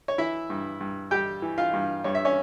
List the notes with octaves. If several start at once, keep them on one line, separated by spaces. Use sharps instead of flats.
C#5
E3 E4 E5
G2
G2
G3 G4 G5
E3
F4 F5
G2
G2 C#5
E5
C#4 C#5